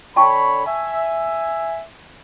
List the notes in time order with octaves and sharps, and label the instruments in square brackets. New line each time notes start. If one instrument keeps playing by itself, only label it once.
[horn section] D3 C#5 B5 [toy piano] G5 A5 C#6
[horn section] E5 G#5